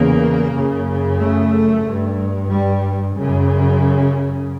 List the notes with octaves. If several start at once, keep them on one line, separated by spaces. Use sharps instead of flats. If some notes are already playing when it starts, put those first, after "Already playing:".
Already playing: E2 C#3 A#3
F#2 C#3
A3
G2
G3
F#2 C#3